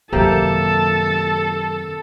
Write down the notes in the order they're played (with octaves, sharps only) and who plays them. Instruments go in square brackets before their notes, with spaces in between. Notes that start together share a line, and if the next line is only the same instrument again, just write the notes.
[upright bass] F#2 D#3 [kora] C3 A#3 G4 [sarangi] A4 [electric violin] A5